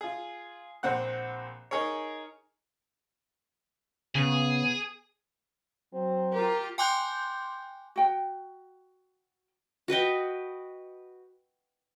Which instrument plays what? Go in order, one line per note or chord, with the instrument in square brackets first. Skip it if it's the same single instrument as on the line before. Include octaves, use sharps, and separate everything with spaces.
[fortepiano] F4 G#4
A#1 C4 F#5 F#6
D#4 G#4 A#4 C#5
[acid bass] C#3 [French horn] B3 [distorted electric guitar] G#4
[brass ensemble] F#3 [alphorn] C4
[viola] F4 G4 [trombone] A#4
[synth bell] G5 G#5 C6 D6 F#6 G6
[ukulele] F#4 G5
[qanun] F#4 B4 D#5 G5